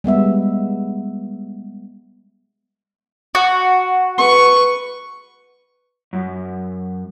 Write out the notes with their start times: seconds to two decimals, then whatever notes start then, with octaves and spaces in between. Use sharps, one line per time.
0.04 G3 G#3 B3 E5
3.35 F#4
4.18 B4 C#6
6.13 F#2